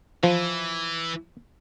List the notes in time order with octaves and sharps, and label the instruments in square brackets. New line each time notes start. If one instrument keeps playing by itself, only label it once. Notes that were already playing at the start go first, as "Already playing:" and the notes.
[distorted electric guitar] E3 [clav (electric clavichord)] F3